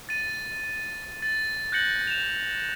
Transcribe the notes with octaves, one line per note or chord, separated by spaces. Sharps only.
A6 D#7
A6
F#6 G6 A#6 C#7 F#7
E7 F7